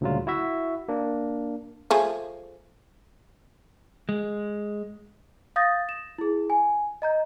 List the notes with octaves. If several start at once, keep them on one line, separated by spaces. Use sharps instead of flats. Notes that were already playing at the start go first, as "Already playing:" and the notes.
D2 A#2 C#3 F#3 G3 F4
E4 F#4 E5
A#3 D4
F3 A3 G#4
G#3
F5 D#6 G6 A6 A#6
E7
E4 G#4
G#5
D#5 A#5 G6